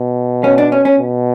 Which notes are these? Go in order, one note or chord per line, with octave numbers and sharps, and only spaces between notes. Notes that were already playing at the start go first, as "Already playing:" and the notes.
Already playing: B2
C#4
D4
C#4
C#4
B2